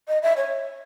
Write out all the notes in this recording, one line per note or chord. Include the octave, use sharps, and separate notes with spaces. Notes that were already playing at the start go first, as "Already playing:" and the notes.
D#5
E5
C#5